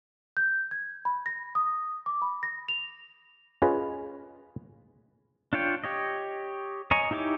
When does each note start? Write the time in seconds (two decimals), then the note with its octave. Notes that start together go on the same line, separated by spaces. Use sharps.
0.37 G6
0.71 G#6
1.05 B5
1.26 A#6
1.55 D#6
2.06 D6
2.22 B5
2.43 A#6
2.68 F7
3.62 C#4 F4 G#4 B4 D#5
5.53 D4 F4 C#5 G5
5.84 G4 C#5 D#5
6.91 C#5 D#5 G#5 A#5 C#6
7.11 D#4 E4 G4 C#5 D6